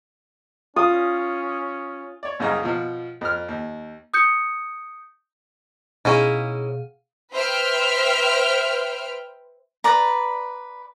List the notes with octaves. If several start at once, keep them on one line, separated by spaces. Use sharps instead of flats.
C#4 F4 D#6
C#5 D5
C2 F#2 C#3 D#5 A#5
B2 F3
F2 F6
D#2
D#6 G6 C#7
B2 C#4 D#4 E4 G#4 F5
B4 C5 E5 G5 F6
B4 D5 A#5